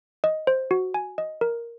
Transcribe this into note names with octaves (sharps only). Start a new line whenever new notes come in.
D#5
C5
F#4
G#5
D#5
A#4